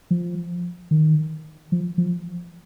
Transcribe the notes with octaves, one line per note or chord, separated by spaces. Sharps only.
F3
D#3
F3
F3